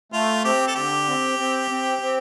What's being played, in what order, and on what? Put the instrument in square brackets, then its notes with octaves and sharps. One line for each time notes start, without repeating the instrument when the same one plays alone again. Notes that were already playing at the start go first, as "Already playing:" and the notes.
[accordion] A3 [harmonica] F4
[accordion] C4 [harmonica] G4
[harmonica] A4
[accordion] D3 [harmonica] G4
[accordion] C4
C4
C4
C4